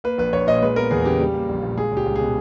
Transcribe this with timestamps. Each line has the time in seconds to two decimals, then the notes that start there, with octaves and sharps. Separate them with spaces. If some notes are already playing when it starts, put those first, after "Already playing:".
0.04 A#3 B4
0.18 A#1 B4
0.32 A#1 C#5
0.47 A#2 D#5
0.62 G#3 B4
0.76 B3 A#4
0.91 E2 G#4
1.05 C#3 G4
1.20 G3
1.34 A#3
1.49 A#1
1.62 A#2
1.77 G#3 G#4
1.92 C#2
1.97 G4
2.06 C#2
2.16 G#4
2.21 B2